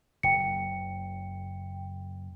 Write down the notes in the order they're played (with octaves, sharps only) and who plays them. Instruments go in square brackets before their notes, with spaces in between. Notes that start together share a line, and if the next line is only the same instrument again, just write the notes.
[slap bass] F#1 [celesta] G5 C#7